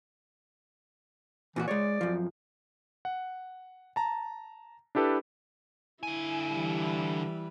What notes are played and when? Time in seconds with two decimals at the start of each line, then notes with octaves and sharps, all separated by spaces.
1.56 A#2 E3 F4 F#4
1.68 G#3 C#5 D5
2.01 F#2 F3
3.05 F#5
3.96 A5 A#5
4.95 D4 E4 G4 A4 B4
6.03 D3 E4 G#5
6.52 E3 G3 B4